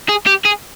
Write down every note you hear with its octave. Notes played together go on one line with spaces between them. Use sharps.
G#4
G4
G#4